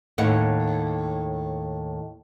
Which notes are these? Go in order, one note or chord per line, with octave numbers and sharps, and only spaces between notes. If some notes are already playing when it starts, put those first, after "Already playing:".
D#2 A2 F#5